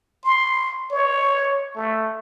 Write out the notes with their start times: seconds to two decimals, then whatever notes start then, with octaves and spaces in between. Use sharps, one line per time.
0.25 C6
0.91 C#5
1.76 A3